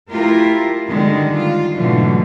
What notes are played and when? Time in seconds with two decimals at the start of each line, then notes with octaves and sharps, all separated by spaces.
0.10 A3 E4 F4 G4 A#4
0.88 D3 D#3 G3 G#3
1.35 F4
1.75 G#2 B2 D3 E3 F#3 A3